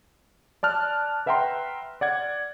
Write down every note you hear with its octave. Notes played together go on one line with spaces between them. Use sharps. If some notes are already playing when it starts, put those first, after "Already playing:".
D5 A5 F6 F#6
B4 E5 F#5 G5 A#5 C6
D5 F#5 G#6